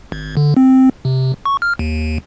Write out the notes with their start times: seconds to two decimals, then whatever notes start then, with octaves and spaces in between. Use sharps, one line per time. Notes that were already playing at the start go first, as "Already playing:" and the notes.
0.12 G#1
0.37 D3
0.57 C4
1.05 C3
1.45 C#6
1.62 F6
1.79 D#2